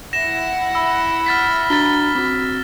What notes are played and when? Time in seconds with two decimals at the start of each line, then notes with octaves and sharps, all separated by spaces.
0.13 E4 F#5 A#6 E7
0.75 B5 E6
1.26 F6 A6 B6
1.70 D4 F#4 A#5 A6 B6 G7
2.15 C4 F#4